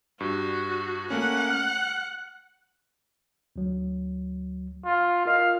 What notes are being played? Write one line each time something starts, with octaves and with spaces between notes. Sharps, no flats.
G2 F#4
A3 A#3 C#4 F#5
F6
D2 F#3
F4
F4 A#4 D#5 F5